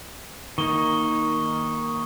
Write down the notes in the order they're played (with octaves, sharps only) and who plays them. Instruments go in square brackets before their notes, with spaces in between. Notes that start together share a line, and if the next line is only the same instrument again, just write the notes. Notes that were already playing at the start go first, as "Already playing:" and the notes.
[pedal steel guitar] D#3 A#3 D#4 [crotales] C#6 D#6 G7